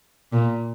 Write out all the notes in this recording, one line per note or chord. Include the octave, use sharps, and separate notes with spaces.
A#2